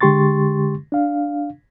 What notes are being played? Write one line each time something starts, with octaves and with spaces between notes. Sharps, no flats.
D3 G#3 G4 C6 C#6 A6
D4 F5